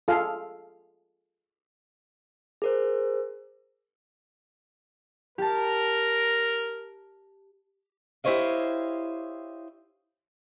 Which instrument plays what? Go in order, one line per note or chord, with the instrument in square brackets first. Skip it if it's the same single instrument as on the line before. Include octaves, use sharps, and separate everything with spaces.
[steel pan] F4 G#4 A4 F5
[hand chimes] G#4 A#4 C5
[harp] G4 A5 [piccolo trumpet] A#4
[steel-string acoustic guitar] E4 G4 C5 C#5 D#5 F5